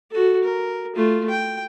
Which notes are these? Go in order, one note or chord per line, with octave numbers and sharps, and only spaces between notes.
F#4 A4
A#4
A3 F4
G5